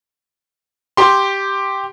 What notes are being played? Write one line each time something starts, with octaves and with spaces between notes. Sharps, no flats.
G4 C6